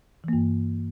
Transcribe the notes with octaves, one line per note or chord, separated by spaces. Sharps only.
G2 E3 A#3